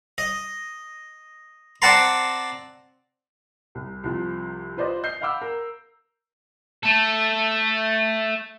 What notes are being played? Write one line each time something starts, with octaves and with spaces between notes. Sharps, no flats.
D#5
C4 D5 F#5 A5 A#5 C6
C2
C2 C3 F3
F4 B4 C5 D5 D#5
D#5 G6 C7
F5 F#5 B5 D6 E6
A#4
A3 A4